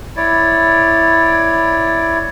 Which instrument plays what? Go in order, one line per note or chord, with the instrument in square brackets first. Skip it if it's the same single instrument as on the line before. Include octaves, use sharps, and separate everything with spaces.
[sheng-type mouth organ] E4 C#5 D5